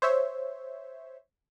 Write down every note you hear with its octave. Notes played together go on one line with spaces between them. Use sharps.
C5 C#5 E5